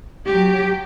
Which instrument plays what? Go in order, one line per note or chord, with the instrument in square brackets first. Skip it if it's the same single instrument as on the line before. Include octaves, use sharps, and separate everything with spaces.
[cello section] F#3 G4